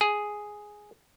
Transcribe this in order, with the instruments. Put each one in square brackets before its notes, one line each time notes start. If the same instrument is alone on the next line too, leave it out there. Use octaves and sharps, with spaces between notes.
[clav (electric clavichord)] G#4